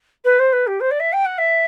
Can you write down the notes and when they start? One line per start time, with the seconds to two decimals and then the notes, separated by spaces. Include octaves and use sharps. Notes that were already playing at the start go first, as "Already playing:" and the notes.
0.25 B4
0.39 C5
0.52 B4
0.67 G4
0.80 C5
0.91 D5
1.00 E5
1.12 G5
1.25 F#5
1.38 E5